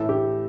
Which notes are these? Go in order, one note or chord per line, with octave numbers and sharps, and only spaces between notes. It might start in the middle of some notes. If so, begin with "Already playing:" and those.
Already playing: A2 E3 A3 A4
G4